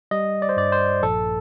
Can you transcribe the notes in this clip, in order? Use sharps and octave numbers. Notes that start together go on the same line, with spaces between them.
G3 D#5
D5
C5
G2 D5
C5
A#1 A4